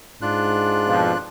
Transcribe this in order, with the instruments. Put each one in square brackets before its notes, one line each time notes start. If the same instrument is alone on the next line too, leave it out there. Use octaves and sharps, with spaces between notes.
[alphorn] G#2 [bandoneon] D4 F4 F#6
[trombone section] F2 B2 F3